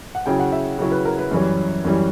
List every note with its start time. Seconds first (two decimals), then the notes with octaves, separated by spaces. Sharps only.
0.15 F#5
0.26 C#3 F#3 C#4 E4 G5
0.39 F#5
0.52 E5
0.78 C#3 F#3 C#4 E4
0.92 B4
1.05 A#4
1.19 B4
1.31 F#2 E3 G3 C#4
1.85 F#2 E3 G3 C#4